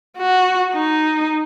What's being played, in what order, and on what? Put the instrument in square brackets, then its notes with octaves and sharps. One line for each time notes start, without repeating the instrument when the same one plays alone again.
[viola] F#4
D#4